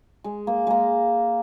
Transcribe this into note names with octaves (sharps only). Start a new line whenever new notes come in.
G#3
A#3
G#3 A#3